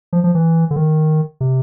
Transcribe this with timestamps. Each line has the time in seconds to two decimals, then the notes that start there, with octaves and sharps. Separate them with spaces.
0.13 F3
0.24 F3
0.35 E3
0.71 D3
0.76 D#3
1.41 C3